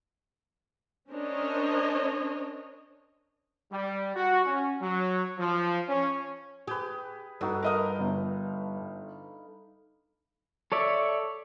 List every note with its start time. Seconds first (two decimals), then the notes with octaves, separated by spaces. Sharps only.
1.10 C#4 D4 A#4 C5 C#5 D#5
3.72 G3
4.15 F#4
4.45 C#4
4.81 F#3
5.39 F3
5.88 C#4
6.67 G4 G#4 B4
7.41 G2 D#4 F#4 A4
7.63 A#4 B4 D#5 F5 D#6
7.99 G1
10.72 A4 C#5 D5 E5